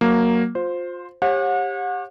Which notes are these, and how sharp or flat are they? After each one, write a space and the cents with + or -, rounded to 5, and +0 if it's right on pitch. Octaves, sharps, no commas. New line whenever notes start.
F#3 +0 A#3 +0
F4 +25 C5 +0
G4 +15 C#5 -35 F#5 -35